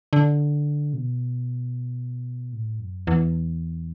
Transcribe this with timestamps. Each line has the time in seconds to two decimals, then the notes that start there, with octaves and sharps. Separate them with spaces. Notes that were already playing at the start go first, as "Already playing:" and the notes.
0.13 D3
0.93 B2
2.53 A2
2.80 F#2
3.07 E2